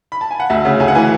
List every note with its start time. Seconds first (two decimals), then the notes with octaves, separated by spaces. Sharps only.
0.12 B5
0.21 A5
0.31 G#5
0.40 F#5
0.50 D2 E5
0.65 C#3
0.80 D2 G#5
0.88 F#5
0.95 E3 G#5